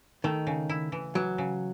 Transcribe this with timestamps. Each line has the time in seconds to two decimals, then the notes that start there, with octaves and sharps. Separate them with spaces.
0.24 D#3 A3
0.47 C#3
0.69 E4
0.92 E3
1.15 E3 F#3
1.38 C#3